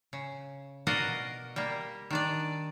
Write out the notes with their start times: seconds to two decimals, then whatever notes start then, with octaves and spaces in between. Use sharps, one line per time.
0.13 C#3
0.87 B2 F#4 A#4 D5 D#5 F5
1.56 G3 A#3
2.10 D#3 D4 D5